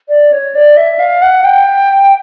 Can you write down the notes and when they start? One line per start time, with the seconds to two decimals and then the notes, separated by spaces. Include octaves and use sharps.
0.08 D5
0.32 C#5
0.55 D5
0.77 E5
0.99 F5
1.22 F#5
1.44 G5